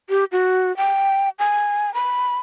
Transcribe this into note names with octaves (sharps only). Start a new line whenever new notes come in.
G4
F#4
G5
G#5
B5